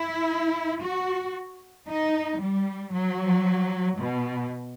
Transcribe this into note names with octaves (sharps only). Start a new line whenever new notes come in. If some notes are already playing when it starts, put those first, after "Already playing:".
Already playing: E4
F#4
D#4
G3
F#3
B2